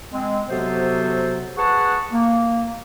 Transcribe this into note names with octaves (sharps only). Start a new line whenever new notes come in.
G#3 C4
C3 F#3 B3 F#4 A4 C5
G#4 B4 F#5 A5 C#6
A#3